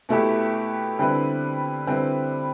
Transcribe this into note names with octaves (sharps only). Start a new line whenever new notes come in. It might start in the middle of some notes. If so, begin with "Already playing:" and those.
B2 A3 E4 G4
D3 G3 C4 E4 B4
D3 G3 C4 E4 B4